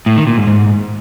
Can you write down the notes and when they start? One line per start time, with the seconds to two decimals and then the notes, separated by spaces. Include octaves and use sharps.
0.06 A2
0.17 D#3
0.27 A#2
0.37 G#2
0.47 G#2